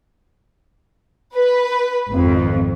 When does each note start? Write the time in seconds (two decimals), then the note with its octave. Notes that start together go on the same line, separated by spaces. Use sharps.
1.34 B4
2.09 G#1 F2